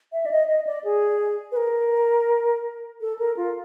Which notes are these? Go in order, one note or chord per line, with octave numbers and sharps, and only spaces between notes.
E5
D5
D#5
D#5
D5
G#4
B4
A#4
A4
A#4
F4